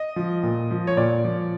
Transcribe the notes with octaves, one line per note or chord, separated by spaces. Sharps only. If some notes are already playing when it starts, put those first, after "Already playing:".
Already playing: D#5
F3
A#2
F3
C#5
A#2 D5
F3